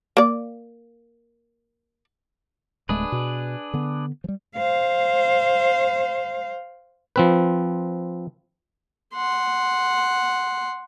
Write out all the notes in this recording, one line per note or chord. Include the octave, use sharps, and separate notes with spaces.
A#3 D5
D1 G#3 A3 D4 G#4 B4
B2
D3 B3
F3 G3
C5 F5
F3 C4 B4
F#5 C6